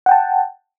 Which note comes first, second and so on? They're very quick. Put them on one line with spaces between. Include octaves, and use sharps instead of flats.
F#5 G5 A5